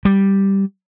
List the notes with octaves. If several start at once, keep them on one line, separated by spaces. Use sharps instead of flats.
G3